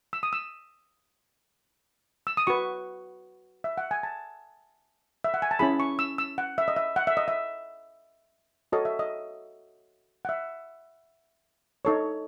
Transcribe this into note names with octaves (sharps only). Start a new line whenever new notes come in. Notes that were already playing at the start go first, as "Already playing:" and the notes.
E6
D#6
E6
E6
D#6
F#4 B4 C#6
E5
F#5
G#5
A5
E5
F#5
G#5
A5
C#4 E4 G#4 B5
C#6
E6
E6
F#5
E5
D#5
E5
F#5
E5
D#5
E5
F#4 A4 C#5 D#5
E5
D#5
F#5
E5
D#4 A4 C#5